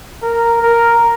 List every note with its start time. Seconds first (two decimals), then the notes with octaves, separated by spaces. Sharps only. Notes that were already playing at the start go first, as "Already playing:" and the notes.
0.22 A#4
0.62 A#4